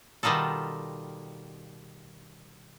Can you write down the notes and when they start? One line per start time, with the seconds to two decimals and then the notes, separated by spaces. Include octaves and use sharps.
0.23 B2 D#3 G3 D#4 F4 A4